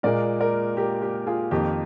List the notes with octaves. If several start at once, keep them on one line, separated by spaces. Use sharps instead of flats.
A#2 G#3 A#4 D5
A#4 D5
G4 A#4
G4
F4 G#4
F2 D#3 A#3 G4 A#4